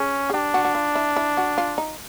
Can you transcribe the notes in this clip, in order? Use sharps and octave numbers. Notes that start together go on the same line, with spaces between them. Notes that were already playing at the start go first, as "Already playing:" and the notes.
Already playing: C#4 G#4
G#4
D4 G4
F#4
F#4
F4
E4
E4
F#4
F4
D#4